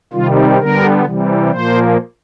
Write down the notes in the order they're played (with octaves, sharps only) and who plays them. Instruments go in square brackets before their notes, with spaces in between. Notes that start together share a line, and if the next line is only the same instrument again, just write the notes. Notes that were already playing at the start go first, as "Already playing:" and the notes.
[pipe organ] C3 D#3 G3 F4
D3 G3 B3 A#4
C3 E3 G3
A#2 F3 A#3 C5